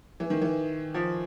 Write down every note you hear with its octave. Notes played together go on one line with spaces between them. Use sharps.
E3
D#3
E3
F3